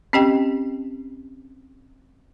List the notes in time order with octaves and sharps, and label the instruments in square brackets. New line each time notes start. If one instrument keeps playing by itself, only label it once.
[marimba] C4 C#4 G4 D#5 G5